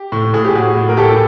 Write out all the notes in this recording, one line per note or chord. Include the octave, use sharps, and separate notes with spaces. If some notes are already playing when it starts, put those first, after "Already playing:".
Already playing: G4
A2
A2 G#4
G4
A2 F#4 G#4
A2
A#4
A2 G4 A4